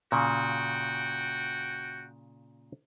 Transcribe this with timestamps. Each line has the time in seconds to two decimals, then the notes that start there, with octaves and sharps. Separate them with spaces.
0.12 A#2 C#3 F#4 G5